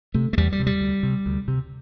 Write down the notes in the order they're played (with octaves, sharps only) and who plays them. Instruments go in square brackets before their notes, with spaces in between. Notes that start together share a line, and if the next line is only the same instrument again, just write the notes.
[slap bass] C3 A3
A3
E2 G3
G3
C3
G3
D2
C3
D2
C3